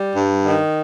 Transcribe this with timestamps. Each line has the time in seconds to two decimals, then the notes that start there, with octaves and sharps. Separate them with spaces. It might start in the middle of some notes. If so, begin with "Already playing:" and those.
Already playing: G3
0.16 G2
0.45 D#3